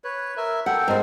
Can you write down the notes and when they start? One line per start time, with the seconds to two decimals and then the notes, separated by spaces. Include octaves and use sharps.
0.04 B4 C#5
0.37 A#4 E5
0.66 A4 F#5 G5
0.88 G#2 C4 A#4 C5